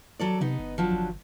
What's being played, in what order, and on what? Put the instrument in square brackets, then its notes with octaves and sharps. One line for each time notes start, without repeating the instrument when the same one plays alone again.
[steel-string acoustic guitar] F#3 A4 D5
[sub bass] C3 [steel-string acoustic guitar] B3 D#4
[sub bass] G1
[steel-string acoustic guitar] F3 F#3 D4
[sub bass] G1